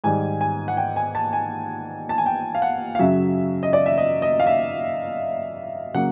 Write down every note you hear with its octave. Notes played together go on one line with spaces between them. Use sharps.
G#2 D#3 G3 G#5
G#5
F#5
G5
G#5
A5
G#5
A5
G#5
G5
F5
F#5
F5
F#2 C#3 F#3 E5
D#5
D5
E5
D#5
D#5
F5
E5
C#3 F#3 A#3 F#5